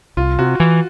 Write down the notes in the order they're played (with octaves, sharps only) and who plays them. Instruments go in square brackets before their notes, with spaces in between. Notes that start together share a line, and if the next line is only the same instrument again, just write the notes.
[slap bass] C2 [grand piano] F4
[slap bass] C3 [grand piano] F#4
[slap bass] E3